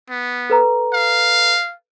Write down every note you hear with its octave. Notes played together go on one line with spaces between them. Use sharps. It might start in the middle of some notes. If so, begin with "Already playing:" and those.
B3
A4 B4 A#5
F5